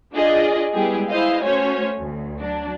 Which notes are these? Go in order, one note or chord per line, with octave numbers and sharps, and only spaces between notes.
D4 F4 G#4 D5 D#5
G3 G#3 B3 E4 G4 G#4
E4 G#4 C5 D#5 F5
A3 C#4 F#4 C5 C#5 G#5
D2
F#3 D4